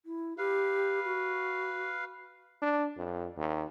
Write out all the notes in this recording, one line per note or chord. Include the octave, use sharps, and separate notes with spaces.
E4
G4 B4 F5
F#4
D4
F2
D#2